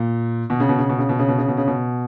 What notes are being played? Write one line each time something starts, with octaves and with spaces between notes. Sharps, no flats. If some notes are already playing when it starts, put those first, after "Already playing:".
Already playing: A#2
B2
C#3
B2
C#3
B2
C#3
B2
C#3
B2
C#3
B2
C#3
B2